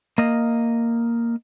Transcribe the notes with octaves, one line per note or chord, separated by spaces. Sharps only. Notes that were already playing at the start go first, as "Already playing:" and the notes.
A#3 D#5